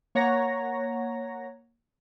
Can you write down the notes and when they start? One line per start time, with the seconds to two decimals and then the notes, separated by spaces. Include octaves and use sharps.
0.15 A#3 C#5 F#5 A#5 A#6